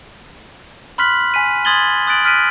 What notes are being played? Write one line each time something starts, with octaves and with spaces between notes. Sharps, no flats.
B5 C6 F6 F#6 B6 F#7
G#5 B6 D#7
C6 D#6 G#6 A6 F#7 G7
D#6 F#6 A6 D7 F#7
F6 F#6 B6 D7 D#7